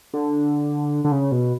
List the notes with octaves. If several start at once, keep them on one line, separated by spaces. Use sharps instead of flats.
D3
D3
C#3
B2